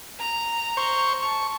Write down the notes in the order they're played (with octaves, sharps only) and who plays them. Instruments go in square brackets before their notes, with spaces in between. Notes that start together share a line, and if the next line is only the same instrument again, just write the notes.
[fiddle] A#5
[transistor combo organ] C5 C#6
[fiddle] A5 [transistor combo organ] C#6